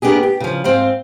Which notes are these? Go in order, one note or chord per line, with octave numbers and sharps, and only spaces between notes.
A#3 B3 D4 D#4 G4 G#4
G4
C#3 F3
G#2 C4 C5 F5